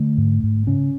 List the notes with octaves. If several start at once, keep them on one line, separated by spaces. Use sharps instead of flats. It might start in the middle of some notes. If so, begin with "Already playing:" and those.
Already playing: D3 A3
G#2
G#2
C#3 C#4